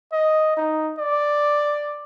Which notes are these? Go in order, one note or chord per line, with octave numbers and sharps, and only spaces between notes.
D#5
D#4
D5